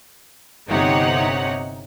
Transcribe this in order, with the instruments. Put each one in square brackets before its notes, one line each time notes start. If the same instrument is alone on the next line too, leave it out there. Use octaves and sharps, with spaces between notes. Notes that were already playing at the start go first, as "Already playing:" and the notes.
[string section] G1 C3 D#4 C#5 F#5